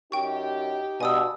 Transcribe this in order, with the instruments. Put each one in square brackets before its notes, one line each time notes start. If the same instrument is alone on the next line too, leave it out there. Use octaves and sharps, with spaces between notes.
[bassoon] F#2 [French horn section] D#4 G4 [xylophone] G5 C#6
[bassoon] G2 [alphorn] B2 [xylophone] G#5 D#6 E6